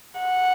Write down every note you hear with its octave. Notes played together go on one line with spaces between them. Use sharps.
F#5